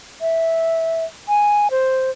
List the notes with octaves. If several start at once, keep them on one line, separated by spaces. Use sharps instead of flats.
E5
G#5
C5